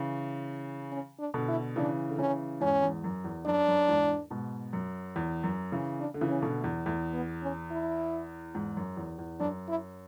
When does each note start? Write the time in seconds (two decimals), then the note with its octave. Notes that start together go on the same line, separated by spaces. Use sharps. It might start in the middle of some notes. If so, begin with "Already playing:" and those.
Already playing: C#3 E3
0.92 C#4
1.20 D4
1.34 B2 D3
1.48 E4
1.76 C#3 E3 D4
2.10 D3
2.18 C#3 E3 C#4
2.61 E2 G#2 C#4
2.82 E2 G#2
3.04 F#2
3.24 E2
3.46 F#2 D4
3.68 F#2
3.88 E2 G#2
4.31 G#2 B2
4.73 F#2
5.16 E2
5.43 F#2
5.72 C#3 E3
6.00 D4
6.14 D3
6.21 C#3 E3
6.29 C#4
6.42 B2 D3
6.58 A3
6.64 E2
6.85 E2 A3
7.14 B3
7.42 C#4
7.71 E4
8.55 E2 G#2
8.77 F#2
8.97 E2
9.19 E2
9.40 F#2 D4
9.68 E4